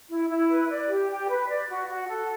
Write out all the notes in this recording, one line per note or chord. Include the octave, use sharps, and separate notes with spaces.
E4
E4
B4
D5
G4
G4
B4
D5
F#4
F#4
A4